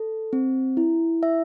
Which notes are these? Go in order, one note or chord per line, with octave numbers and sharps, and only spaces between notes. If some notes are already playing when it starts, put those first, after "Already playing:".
Already playing: A4
C4
E4
E5